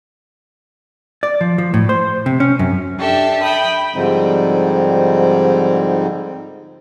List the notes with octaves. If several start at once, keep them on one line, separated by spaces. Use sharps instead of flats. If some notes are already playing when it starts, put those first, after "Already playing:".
D5
F3
F3
A2
C5
C3
C#4
F#2
D4 G4 A4 E5
E5 G5 B5 D#6
G#2 D3 F3 G3 C4 D#4